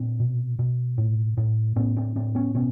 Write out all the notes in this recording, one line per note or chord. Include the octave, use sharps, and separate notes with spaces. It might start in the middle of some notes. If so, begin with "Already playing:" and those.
Already playing: A#2 C4 D4
B2
B2
A2
A2
A2 B3 C#4
C4 D4
A2 C4 D4
B3 C#4
B2 B3 C#4